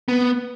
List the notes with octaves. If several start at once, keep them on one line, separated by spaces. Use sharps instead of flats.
B3